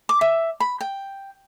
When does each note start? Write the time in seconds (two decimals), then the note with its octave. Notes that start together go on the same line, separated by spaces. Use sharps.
0.09 D6
0.21 E5
0.60 B5
0.81 G5